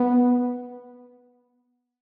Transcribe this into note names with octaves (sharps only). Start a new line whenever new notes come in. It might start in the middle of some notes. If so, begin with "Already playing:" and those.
Already playing: B3